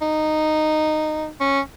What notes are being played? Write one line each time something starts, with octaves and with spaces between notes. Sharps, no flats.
D#4
C#4